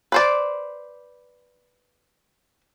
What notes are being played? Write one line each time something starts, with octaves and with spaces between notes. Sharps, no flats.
B4 C5 D5